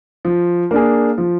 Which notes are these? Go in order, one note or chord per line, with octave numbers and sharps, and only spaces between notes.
F3
A#3 D4 G#4
F3